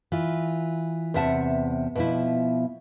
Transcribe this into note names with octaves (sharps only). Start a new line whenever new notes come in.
E3 F4
E2 C3 E5 F#5 A5
B2 F3 E4